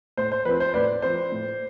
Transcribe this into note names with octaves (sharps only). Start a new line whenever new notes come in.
A2 C5
C5
F3 C4 B4
C5
A2 B4 D5
F3 C4 C5
A2